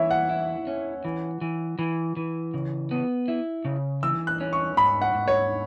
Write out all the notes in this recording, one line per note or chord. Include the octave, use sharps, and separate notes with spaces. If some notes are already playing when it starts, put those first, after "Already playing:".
Already playing: E3 C#5 E5
F#5
E4
C#4
E3
E3
E3
E3
C#3
B3
E4
C#3
E3 E6
F#6
C#4
C#6
G#2 B5
F#5
G#2
C#5